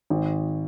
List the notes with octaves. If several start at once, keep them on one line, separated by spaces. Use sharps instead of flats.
G#1